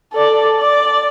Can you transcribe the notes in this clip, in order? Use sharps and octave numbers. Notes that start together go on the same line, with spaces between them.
A4 D5
D5